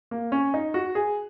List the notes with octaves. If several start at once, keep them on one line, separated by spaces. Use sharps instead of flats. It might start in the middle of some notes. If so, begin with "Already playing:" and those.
A#3
C#4
D#4
F#4
G#4